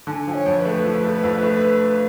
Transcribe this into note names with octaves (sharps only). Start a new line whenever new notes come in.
D3 G#5 A5
F3
C#5
F2
B4
A3
F3
A3
F2
A3